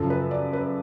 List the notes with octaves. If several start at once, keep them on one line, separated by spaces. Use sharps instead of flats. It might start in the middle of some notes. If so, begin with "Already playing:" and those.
Already playing: F#2 C#3 F3 A4
B4
D5
B4